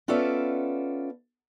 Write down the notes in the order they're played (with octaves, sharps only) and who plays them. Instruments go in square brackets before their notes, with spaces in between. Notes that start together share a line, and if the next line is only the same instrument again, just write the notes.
[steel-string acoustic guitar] B3 C#4 F4 A4 D5 E5